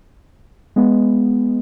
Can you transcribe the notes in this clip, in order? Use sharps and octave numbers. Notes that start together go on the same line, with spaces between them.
G#3 B3